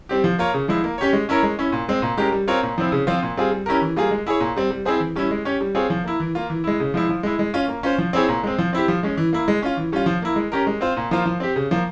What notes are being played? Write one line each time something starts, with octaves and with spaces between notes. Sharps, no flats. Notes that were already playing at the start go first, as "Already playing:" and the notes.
G3 C4 G4
F3
A#3 F4 A#4 C#5
C#3
F3 G#3 E4
A#3
C#4 G4 C#5
G#3
C#4 E4 A#4 C#5
G#3
C#4 E4
A#2
G#3 C4
A#2
G#3 C#4 G4 A#4
G3
C4 F4 A#4 C#5
A#2
F3 C4 E4
C#3
F3 C4 F4 C5
A#2
G3 C4 F4 G#4
G3
C#4 E4 G4 A#4
E3
G3 A#3 F4 G#4
G#3
E4 G#4 C#5
A#2
G3 C4
G3
C4 E4 G#4 C5
E3
G3 C#4 E4
G#3
C#4 G4 C#5
G3
C4 F4 G#4 C#5
F3
A#3 E4
E3
A#3 F4
E3
G#3 E4
C#3
F3 G#3 E4
F3
G#3 E4
G#3
C#4 F4
A#3
C#4 F4 C5
F3
C4 E4 G#4 C#5
A#2
G#3 C4
F3
C4 E4 G4
F3
G#3 C#4
E3
A#3 E4
G#3
C#4 F4
E3
G3 C#4 F4
F3
A#3 E4
G#3
C#4 G4 A#4
G#3
C4 F4 C5
A#2
F3 A#3 F4 C5
F3
C4 G4
C#3
F3 A#3